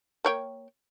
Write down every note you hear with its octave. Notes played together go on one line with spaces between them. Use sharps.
A#3 C#5 G5